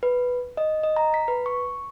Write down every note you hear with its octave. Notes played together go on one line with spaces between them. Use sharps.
B4
D#5
D#5
A#5
B6
B4
C#6